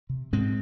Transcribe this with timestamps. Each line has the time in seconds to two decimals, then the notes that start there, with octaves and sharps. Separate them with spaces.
0.10 C3
0.33 G#2 G#3 C4